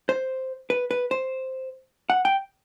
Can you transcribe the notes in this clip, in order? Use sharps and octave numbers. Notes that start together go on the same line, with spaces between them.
C5
B4
B4
C5
F#5
G5